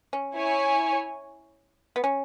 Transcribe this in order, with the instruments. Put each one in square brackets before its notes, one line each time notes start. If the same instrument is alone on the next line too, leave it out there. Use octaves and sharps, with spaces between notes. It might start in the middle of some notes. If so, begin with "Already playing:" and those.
[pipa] C#4
[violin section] E4 C#5 G#5
[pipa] B3
C#4